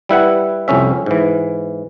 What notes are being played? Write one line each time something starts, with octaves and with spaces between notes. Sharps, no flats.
G3 E4 B4 F#5
C2 F2 C#4 E5
G#2 E3